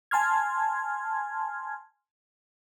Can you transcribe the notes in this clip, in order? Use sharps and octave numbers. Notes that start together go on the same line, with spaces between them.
G#5 A5 C6 F6 G#6